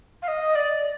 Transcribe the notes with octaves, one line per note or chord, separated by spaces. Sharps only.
F5
D#5
D5